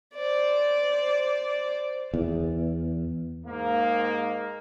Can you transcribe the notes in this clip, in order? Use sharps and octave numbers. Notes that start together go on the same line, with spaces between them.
C5 D5
E2
G#2 A#3